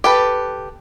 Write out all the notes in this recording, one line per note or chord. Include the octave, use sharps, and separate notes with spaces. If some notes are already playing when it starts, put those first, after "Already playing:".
G4 A4 B4